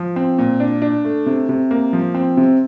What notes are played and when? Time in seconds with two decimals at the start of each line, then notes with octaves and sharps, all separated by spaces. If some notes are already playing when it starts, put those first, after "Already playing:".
Already playing: F3
0.16 C4
0.38 A#2
0.60 D4
0.82 D4
1.05 A3
1.26 C3
1.49 C3
1.71 A#3
1.93 F3
2.15 C4
2.37 C3